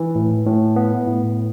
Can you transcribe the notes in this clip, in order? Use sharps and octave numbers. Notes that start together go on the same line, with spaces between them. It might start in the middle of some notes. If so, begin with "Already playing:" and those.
Already playing: E3
A2
A2
B3
A2